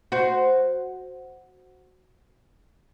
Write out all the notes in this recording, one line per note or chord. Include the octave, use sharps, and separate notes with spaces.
F#4 C5